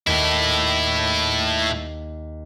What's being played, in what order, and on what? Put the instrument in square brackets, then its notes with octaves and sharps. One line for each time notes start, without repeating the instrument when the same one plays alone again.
[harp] D#2 E7 [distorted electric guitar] A2 E4